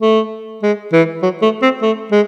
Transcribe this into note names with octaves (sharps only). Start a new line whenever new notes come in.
A3
G#3
E3
F#3
A3
C4
A3
G#3